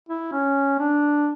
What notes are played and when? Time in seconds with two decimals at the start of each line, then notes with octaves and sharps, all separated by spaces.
0.09 E4
0.32 C#4
0.79 D4